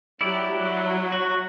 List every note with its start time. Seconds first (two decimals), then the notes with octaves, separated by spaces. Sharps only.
0.21 F#3 E4 G4 D5
0.55 F#3
1.12 F#4